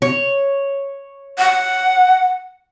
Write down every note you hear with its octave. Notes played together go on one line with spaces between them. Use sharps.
C#5
F#5